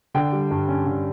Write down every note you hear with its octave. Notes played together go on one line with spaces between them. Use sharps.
D3 G5
G3
G2
C#4
D3